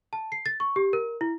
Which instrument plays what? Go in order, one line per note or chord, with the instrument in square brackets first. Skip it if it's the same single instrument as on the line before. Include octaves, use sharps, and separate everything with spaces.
[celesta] A5
C7
A6
C#6
G4
A#4
E4